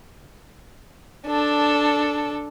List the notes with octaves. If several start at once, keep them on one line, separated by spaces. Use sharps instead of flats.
D4 A4